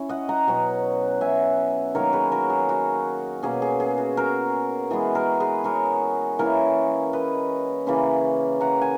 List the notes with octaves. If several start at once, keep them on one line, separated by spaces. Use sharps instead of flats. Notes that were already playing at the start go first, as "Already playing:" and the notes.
Already playing: C#4 E4 C#5
D#5 F#5
F#5 A#5
B2 F#3 C#4
E5 G#5
D#3 F#3 A#3 A#4 C#5
G#4 B4
F#4 A#4
G#4
F#4
B2 A#3 C#4 G#4
G#4
G#4
F#4
F#4 A#4
E3 G#3 B3 G#4
F#4 A#4
G#4 B4
A#4 C#5
E3 A#3 C#4 E4 A#4 C#5
B4 D#5
C#3 E3 A#3 C#4 G#5 B5
F#5 A#5
G#5